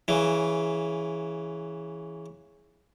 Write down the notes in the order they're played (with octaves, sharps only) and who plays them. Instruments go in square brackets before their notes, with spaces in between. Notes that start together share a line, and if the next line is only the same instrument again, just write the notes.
[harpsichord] C#3 E3